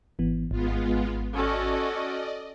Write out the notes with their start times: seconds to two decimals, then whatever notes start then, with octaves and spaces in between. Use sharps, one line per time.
0.19 G#1 E3 B3
0.51 G#1 G#3 B3 F4
1.35 C#4 F#4 A4 D5 D#5